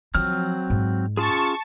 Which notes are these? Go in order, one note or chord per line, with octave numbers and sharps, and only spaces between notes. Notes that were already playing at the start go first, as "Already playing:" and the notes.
F3 F#3 C4 F6
G#2
C#4 F4 G#4 A5 C#6